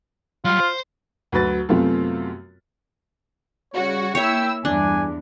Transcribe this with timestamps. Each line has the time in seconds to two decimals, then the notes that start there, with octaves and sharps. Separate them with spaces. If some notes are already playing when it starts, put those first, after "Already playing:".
0.45 F#3 G3 F4
0.60 C5
1.32 D2 F#3 B4 A6
1.69 F#2 C3 A3 B3 C4 F4
3.73 C#3 G3 F#4 C#5
4.15 A#3 E4 C#5 E5 G5 E6
4.65 E2 G2 D4 G#5